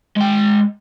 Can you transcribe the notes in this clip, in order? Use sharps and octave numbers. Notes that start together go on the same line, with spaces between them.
G#3 G5